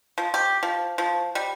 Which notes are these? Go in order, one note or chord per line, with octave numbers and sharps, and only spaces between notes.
F3
G4
F3
F3
G3